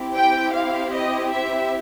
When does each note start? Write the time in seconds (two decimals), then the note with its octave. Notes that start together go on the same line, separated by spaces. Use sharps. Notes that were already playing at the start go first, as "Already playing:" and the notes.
Already playing: C4 E4 G4
0.16 G5
0.54 F5
0.93 D#5
1.31 E5